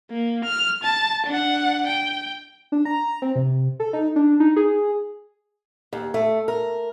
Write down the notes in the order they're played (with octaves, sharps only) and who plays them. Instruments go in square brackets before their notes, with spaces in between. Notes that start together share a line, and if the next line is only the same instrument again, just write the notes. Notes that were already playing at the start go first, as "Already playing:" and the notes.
[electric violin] A#3
F6
A5
D4 F#5
G5
[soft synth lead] D4
A#5
C4
C3
A4
D#4
D4
D#4
G#4
[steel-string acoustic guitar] D#2
A3
A#4